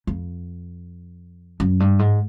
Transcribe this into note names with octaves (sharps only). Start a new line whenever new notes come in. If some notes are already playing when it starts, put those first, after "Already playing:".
F2
F#2
G2
G#2